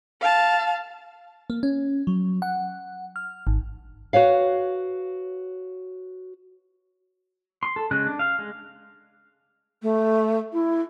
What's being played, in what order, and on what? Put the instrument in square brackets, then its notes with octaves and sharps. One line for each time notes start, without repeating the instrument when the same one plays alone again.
[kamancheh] F5 A5
[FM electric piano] A#3
C#4
F#3
F#5
F6
G#1
[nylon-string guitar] F#4 B4 C#5 F5
[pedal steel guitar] C6
A4
C#3 G#3 F#6
D4
F5
G#3
[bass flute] A3
E4